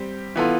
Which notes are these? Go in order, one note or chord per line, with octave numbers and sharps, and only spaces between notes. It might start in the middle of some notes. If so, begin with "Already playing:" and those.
Already playing: G3 C4 G4
E3 B3 F4 A4